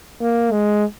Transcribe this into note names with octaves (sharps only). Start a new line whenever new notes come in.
A#3
G#3